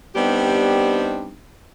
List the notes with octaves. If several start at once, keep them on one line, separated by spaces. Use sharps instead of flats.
G3 B3 C4 D4 D#4 G4